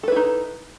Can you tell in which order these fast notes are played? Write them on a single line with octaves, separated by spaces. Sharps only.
A4 B4 E4 D#4